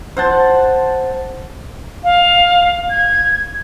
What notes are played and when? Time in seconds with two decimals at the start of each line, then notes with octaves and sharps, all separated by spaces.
0.17 C5 F#5 A5
2.04 F5
2.90 G#6